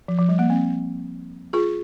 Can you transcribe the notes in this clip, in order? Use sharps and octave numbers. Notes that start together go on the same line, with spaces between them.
F3
F3
G3
A#3
C4
F4 G#4